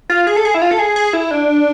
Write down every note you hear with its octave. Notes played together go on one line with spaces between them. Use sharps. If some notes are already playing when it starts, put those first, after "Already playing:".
F4
G#4
A4
G#4
E4
F4
A4
G#4
G#4
E4
D4